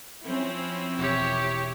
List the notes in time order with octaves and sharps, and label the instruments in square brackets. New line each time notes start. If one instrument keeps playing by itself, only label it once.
[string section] F3 C4 C#4 [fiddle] E4
[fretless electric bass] E1 [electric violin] G4 C#5